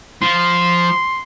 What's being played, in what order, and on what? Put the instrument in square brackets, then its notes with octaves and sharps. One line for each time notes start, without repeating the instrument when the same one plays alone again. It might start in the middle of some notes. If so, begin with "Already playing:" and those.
[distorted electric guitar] F3 [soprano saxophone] C6